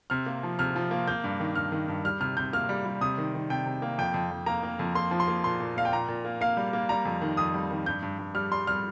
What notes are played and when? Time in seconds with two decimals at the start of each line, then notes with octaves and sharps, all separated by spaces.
0.10 C3 F6
0.26 A#3
0.43 F3
0.59 C3 F6
0.76 F3
0.91 A#3
1.07 A#3 G6
1.24 G2
1.40 D#3
1.55 G2 F6
1.72 D#3
1.88 G2
2.04 G3 F6
2.20 C3 F6
2.37 C3 G6
2.53 A#3 F6
2.69 G3
2.85 G3
3.01 C3 D#6
3.18 D#3
3.34 D#3
3.50 C3 G5
3.66 C3
3.82 A#3
3.98 F2 G5
4.14 F2
4.31 F2
4.46 A#3 A#5
4.63 A#3
4.79 F2
4.95 A#3 C6
5.11 F3
5.20 C6
5.28 A#3
5.44 A#2 C6
5.61 A#2
5.76 A#2 F5
5.85 G5
5.92 A#2 A#5
6.08 A#2
6.25 A#3
6.41 A#3 F5
6.57 G3
6.73 A#3
6.89 G3 A#5
7.05 F2
7.21 D#3
7.37 F2 D#6
7.54 G3
7.71 D#3
7.86 G2 G6
8.02 G2
8.19 G2
8.34 G3 F6
8.51 G3 C6
8.67 G3 F6